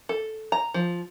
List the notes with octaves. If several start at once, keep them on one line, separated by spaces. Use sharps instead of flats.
A4
A#5
F3